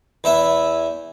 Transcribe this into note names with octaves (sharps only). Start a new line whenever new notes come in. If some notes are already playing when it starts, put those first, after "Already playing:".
E2 E4 E5